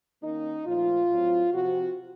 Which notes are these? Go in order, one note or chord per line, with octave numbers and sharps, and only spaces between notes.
D#3 A#3 C#4 D#4
A#2 F3 A3 F4
A2 F#3 C4
C3 F3 C4 F#4